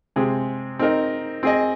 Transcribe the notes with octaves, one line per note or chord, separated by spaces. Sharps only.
C3 G#3 C4 G#4
C4 D#4 A#4 D#5
C4 G#4 D#5